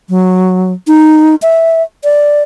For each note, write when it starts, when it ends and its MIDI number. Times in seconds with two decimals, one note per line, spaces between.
0.09 0.73 54
0.87 1.35 63
1.42 1.83 76
2.04 2.43 74